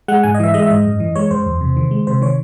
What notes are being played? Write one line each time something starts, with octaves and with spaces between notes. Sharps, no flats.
G#3 F#5
G#2 G#5
D#5
E3 E5
G#3 D#5
E5
G#2 D#5
F#2
E3
G#3 C#5
F#2 C5
E2
C3
D#3
G#3
C3 C5
D#3 C#5